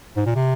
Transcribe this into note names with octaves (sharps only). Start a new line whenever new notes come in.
G#2
A#2
C3